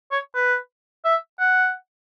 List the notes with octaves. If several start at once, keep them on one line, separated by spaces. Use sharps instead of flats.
C#5
B4
E5
F#5